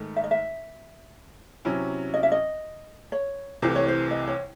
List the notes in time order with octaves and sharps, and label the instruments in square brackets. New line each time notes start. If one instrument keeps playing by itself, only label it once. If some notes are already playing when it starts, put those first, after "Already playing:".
Already playing: [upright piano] G#2 D#3 A3
[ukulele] E5
D#5
E5
[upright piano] C3 F#3 C#4 E4
[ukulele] D#5
E5
D#5
C#5
[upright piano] C2 C3 E3 A3 [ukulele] C5
[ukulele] C#5
C5
D#5
C#5